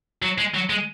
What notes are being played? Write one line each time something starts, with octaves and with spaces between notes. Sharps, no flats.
F#3
G#3
F#3
G#3